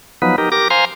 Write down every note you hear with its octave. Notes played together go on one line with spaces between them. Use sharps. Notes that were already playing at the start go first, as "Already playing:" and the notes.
F3 F#3 B3 D#4 B4
D#4 G4 A#4
G4 A#4 D6 A#6
C5 F5 G#5 A#5 C6